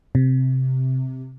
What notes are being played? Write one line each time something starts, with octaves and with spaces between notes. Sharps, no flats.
C3